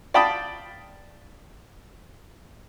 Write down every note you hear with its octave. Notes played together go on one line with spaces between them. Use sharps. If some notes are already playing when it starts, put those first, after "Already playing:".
D5 F5 G5 A5 B5 D#6